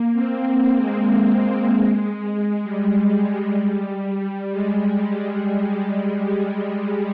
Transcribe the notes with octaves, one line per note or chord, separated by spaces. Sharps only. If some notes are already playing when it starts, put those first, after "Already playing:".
Already playing: A#3
C4
A#3
G#3
G3
G#3